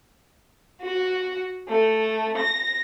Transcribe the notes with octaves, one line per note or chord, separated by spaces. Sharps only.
F#4
A3
A#6